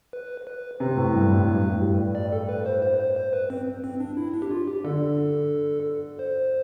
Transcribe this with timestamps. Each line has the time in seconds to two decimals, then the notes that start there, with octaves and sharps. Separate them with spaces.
0.13 B4
0.47 B4
0.80 C3 B4
0.97 A2
1.14 G2
1.31 A2
1.48 G2
1.64 A2
1.81 G3
2.15 D5
2.32 A4
2.49 B4
2.66 C5
2.83 C5
2.99 C5
3.16 C5
3.33 B4
3.50 C4
3.84 C4
4.00 D4
4.17 E4
4.34 D4
4.42 G4
4.51 F4
4.68 G4
4.84 D3 A4
6.19 C5